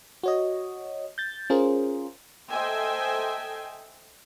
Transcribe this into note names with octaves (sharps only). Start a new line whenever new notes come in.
F#4 C#5 D#5
G6 A6
C#4 F4 G#4 A#4 C5
A4 C5 D#5 E5 G5 G#5